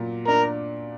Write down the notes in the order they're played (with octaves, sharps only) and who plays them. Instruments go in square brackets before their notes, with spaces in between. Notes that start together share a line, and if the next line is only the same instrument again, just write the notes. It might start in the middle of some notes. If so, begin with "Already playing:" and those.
Already playing: [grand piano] A#2 F#3
[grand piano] D4 [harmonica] A#4